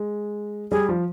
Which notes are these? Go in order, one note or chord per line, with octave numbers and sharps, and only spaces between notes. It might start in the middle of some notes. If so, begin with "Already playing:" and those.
Already playing: G#3
G3 G#4
F3